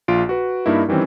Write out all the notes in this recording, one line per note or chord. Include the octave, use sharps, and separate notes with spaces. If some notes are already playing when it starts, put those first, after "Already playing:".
A#1 F4 D7
F#4 B4
G2 A#3 D#4 E4
D#3 E3 G3 C4 C#4